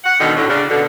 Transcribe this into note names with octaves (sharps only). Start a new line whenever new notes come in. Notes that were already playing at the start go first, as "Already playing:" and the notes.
F#5
B2 D3 D#3 D#4
A2 D3 F#3
C#3 D4
B2 D3